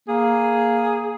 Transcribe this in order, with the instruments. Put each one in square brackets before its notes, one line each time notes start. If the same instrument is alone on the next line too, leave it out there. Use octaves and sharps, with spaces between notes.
[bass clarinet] A#3 [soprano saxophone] G#4